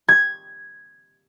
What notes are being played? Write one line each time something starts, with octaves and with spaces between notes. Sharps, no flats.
G#6